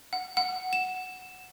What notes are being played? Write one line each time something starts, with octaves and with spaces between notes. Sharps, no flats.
F#5
F#5
E7